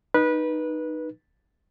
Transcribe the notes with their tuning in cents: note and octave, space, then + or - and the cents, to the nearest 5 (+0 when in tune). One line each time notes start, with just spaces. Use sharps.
D#4 -15 B4 -20